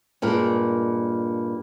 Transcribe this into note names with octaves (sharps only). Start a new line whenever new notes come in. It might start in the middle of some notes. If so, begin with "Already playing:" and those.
G2 A#2 G#3 A#4